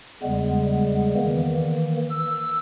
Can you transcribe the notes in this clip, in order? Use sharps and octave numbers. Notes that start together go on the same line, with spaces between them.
E2 C#3 G3 G#3 B3
D#3 E3 A#3
E6